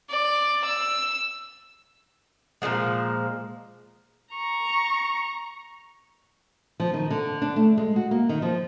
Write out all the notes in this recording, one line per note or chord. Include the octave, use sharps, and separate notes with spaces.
D5
E6
A#2 C#3 F3 G#3
A#5 C#6
F3
D#3
D3
D4
A3
G#3
F#4
A#3
D#3
F3